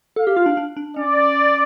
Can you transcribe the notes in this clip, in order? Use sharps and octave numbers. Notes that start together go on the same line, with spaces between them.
A4 F5
G4
F4
D4
D4
D4
C#4 D5